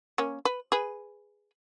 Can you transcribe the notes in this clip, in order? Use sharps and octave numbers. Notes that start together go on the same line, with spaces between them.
A#3 C#4
B4
G#4 B4